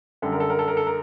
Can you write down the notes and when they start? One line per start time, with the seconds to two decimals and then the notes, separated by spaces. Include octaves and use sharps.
0.22 F#2 D3 G3 A4
0.32 A#4
0.40 A4
0.50 A#4
0.59 A4
0.68 A#4
0.77 A4
0.87 A#4